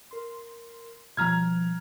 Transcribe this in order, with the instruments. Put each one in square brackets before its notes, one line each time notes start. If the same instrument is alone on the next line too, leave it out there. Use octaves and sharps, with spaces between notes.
[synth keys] A#4 C6
[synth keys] B2 F3 G3 [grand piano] A#5 F6 G#6